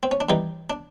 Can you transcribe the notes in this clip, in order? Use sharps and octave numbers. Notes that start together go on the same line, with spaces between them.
C4
C#4
D4
G2 E3 G3 D#4
D4